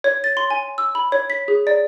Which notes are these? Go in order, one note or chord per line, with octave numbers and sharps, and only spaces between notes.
C#5
A6
C6
G#5
E6
B5
C#5
B6
G#4
D5